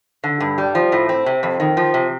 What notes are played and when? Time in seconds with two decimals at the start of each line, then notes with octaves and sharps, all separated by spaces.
0.24 D3
0.40 G2
0.58 G3
0.75 F3
0.92 A2
1.09 C4
1.26 C3
1.43 F2
1.60 D#3
1.77 F3
1.94 C3